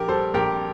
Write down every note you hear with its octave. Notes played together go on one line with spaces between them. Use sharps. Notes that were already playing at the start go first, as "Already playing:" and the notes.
Already playing: A#1 G4 A#4
G3 A4 C5
A#1 G4 A#4